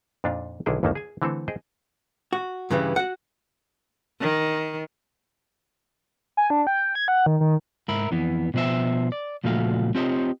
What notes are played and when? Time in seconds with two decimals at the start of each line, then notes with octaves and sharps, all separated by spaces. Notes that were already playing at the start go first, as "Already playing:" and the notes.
0.24 F2 A#2 D4 D#4 F4
0.66 B1 D3 D#3 E4 G#4 G5
0.83 G1 D#2 D#3 A3 A#3 A5
0.95 G#4 G#5
1.22 D3 E3 A3 C4 A4
1.48 G#4 C5 D#5 G5
2.33 F#4
2.70 G2 C#3 E3 G3
2.96 F#4 F#5
4.21 D#3
6.37 G#5
6.50 D4
6.67 G5
6.95 G#6
7.08 F#5
7.26 D#3
7.41 D#3
7.89 G#2 A#4 E5 B5
8.11 F2 E3 B3
8.54 B2 F3 B3 C5 E5
9.12 D5
9.44 C#2 A#2 F3 A3 F#4 F5
9.95 C4 F4 G4 C5 C#5 D#5